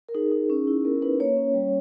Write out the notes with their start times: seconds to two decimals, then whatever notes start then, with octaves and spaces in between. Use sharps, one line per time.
0.09 A#4
0.15 D#4 G#4
0.32 D#4
0.50 C#4
0.67 E4
0.85 B3 A#4
1.02 D#4 B4
1.20 A#3 C#5
1.37 C#4
1.54 G3